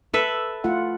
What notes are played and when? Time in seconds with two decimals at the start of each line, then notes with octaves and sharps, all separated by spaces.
0.13 A4 B4 E5
0.64 A3 F4 F#5